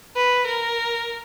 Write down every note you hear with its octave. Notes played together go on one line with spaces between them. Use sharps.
B4
A#4